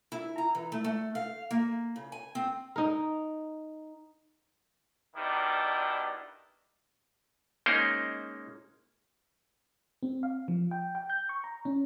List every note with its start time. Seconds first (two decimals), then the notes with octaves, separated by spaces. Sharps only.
0.12 E4
0.38 A#5
0.55 E3
0.72 A3
0.84 A3
1.15 F5
1.51 A#3
1.96 C#3
2.12 G#5
2.35 C4
2.76 D#4 A#4
5.15 B2 D#3 G3 D4 E4
7.66 G#3 A#3 C#4 D#4 A#4 C5
10.03 C4
10.23 F5
10.48 F3
10.71 G5
10.95 G5
11.10 G6
11.29 C#6
11.44 A#5
11.65 C#4